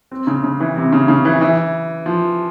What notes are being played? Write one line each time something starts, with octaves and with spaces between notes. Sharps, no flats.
C4
C#3
C#3
E3
C3
C#3
C#3
E3
E3
F3